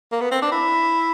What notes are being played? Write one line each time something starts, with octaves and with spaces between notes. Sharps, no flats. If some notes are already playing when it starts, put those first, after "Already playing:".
A#3
B3
C4
D4
E4